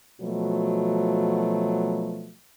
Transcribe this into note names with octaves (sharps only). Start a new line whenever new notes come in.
B2 F3 F#3 A3